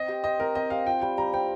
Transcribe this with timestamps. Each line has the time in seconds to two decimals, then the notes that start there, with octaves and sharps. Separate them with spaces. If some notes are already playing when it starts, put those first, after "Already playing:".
Already playing: C4 D#5
0.08 G4
0.24 C5 D#5
0.40 C4 A#4
0.55 C4 D#5
0.70 G4 F5
0.86 F4 G5
1.02 G3 G5
1.17 G3 A#5
1.33 C4 G5